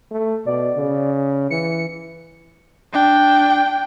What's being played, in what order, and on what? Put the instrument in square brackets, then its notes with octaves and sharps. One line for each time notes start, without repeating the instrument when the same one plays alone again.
[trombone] A3
[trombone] B2 [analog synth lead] D5
[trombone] C#3
[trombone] E3 [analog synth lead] C#7
[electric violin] D4 G5